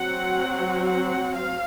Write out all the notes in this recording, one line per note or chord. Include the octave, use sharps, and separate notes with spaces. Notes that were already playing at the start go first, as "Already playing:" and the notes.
Already playing: F#3 C4 F#5
F#5
F5